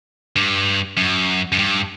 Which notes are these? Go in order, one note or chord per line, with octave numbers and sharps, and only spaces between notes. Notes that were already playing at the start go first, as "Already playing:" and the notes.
G2
F#2
F#2
G2